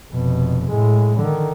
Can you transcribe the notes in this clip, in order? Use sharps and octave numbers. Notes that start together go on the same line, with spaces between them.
F1 B2
A2 G#3
D3 D#3